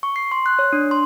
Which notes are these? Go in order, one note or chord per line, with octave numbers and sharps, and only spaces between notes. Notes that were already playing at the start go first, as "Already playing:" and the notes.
C#6
C7
C6
F#6
C#5
D4
C6